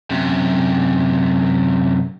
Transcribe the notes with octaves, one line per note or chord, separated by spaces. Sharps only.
F#2 C3